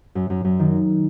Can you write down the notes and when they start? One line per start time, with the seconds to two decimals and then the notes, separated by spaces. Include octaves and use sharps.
0.15 F#2
0.30 F#2
0.45 F#2
0.59 D#3